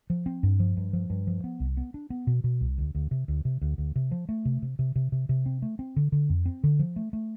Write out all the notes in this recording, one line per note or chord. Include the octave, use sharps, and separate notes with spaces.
F3
C4
G2
F3
G2
F3
G2
F3
B3
C2
B3
D4
B3
B2
B2
C2
D2
D2
C3
D2
C3
D2
D2
C3
F3
A3
C3
C3
C3
C3
C3
C3
C4
A3
C4
D3
D3
F2
C4
D3
F3
A3
A3